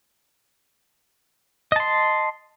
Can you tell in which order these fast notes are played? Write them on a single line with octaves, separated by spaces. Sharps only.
D#5 A5 C6